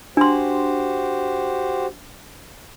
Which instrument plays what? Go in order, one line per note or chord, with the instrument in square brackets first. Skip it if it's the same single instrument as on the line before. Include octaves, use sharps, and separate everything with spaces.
[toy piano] D4 C6 [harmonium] F#4 G4 C5